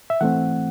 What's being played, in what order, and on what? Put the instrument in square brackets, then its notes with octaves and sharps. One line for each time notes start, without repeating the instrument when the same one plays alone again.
[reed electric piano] E5
E3 A3 C4 F#5